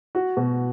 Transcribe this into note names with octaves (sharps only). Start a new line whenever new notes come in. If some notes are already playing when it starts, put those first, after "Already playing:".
F#4
B2